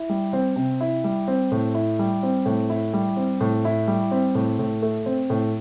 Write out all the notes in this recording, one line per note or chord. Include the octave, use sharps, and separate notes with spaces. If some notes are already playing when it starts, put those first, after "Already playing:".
Already playing: E4
G3
C4
C3
E4
G3
C4
A2
E4
G3
C4
A2
E4
G3
C4
A2
E4
G3
C4
A2
A2
A3
C4
A2